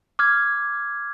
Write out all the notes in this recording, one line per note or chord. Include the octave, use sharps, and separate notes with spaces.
D6 F6 G#6